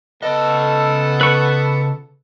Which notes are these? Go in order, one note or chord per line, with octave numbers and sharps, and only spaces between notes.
C#3 B3 A4 D#5
B4 C#6